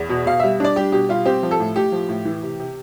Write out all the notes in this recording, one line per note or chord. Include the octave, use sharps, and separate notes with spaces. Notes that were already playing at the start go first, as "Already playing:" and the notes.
Already playing: E2
B2
B2 F5
G3 E5
D4 D5
G3 G4
B2 G4
G3 F4
C4 G4
F3
A4
A2
A2 G4
F3
A2
E3
C3
C3